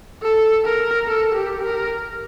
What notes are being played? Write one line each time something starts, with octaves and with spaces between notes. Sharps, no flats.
A4
A#4
A4
G4
A#4